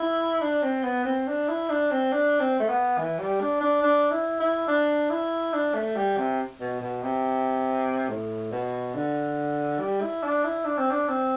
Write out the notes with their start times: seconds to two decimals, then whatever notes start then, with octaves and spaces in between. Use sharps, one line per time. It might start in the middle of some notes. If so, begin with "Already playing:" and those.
Already playing: E4
0.41 D4
0.62 C4
0.83 B3
1.05 C4
1.27 D4
1.48 E4
1.69 D4
1.91 C4
2.12 D4
2.40 C4
2.60 A3
2.68 B3
2.98 E3
3.19 G3
3.40 D4
3.61 D4
3.83 D4
4.11 E4
4.40 E4
4.68 D4
5.10 E4
5.53 D4
5.74 A3
5.96 G3
6.17 C3
6.60 B2
6.80 B2
7.03 C3
8.09 A2
8.52 B2
8.94 D3
9.79 G3
10.01 E4
10.23 D4
10.44 E4
10.65 D4
10.78 C4
10.90 D4
11.08 C4